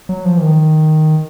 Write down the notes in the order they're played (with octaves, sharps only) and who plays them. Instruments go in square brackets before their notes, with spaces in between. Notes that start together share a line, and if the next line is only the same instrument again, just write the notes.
[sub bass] F#3
F3
E3
D#3